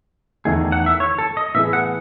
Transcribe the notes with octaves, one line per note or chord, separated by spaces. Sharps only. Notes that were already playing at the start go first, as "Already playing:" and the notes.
E2 D#3 A3 G#4
F#5
E5
C#5
A4
D#5
A2 E3 B3 E4 G#4 E5
F#5